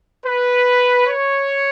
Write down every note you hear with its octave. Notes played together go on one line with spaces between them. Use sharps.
B4
C#5